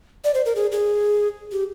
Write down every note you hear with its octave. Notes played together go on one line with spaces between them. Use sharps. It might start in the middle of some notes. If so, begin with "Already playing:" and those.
D5
C5
A#4
G#4
G#4
G4